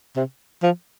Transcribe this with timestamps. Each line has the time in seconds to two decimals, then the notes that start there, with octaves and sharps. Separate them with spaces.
0.16 C3
0.63 F3